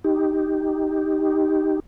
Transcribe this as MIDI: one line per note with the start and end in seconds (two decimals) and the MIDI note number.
0.04 1.80 63
0.04 1.80 67